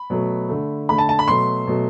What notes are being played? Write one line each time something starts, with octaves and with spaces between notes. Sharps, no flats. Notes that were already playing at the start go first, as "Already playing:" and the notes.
Already playing: B5
B2 F#3 A3
D3 A3
D3 A3 B5
A5
A5
B5
B2 F#3 A3 C6
B2 F#3 A3